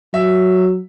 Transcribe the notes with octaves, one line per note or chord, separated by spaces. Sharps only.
F#3 E5